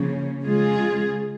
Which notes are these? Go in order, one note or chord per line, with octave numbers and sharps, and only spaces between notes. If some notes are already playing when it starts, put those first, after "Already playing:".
Already playing: C#3 F3 A#3 C#4
C#3 G#3 F4 G#4